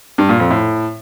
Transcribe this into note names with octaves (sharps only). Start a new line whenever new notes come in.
G2
A#2
F2
A2